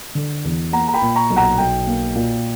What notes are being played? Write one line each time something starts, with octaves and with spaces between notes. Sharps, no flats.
D3
E2
A#3 F#5 A#5
A#5
G5 B5
A#2
A#5 C#6
B1
F#5 A#5
B1 G5
A#3
A#2